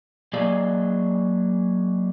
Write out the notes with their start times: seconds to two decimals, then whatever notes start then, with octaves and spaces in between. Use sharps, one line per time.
0.33 F#3 A#3 G#4 D5 D#5 F5